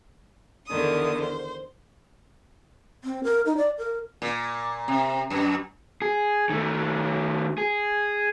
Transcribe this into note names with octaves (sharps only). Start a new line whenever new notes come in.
E2 D3 D#3 D#6
C5
C4
A#4
D#4
D5
A#4
A#2
C3
F#2
G#4
D#3 A3
G#4